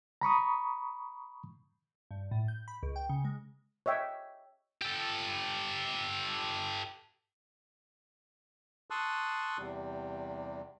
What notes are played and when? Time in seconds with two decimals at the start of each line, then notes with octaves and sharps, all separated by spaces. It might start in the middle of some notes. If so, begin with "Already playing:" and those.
0.21 A#5 B5 C#6 D#6
2.11 G2
2.31 A2
2.48 G6
2.68 B5
2.83 C#2
2.96 G5
3.09 C#3
3.24 G#3
3.86 C#5 D#5 E5 G5
4.82 G4 A4
8.90 A5 C6 C#6 D#6 E6 F#6
9.58 E2 C3 G3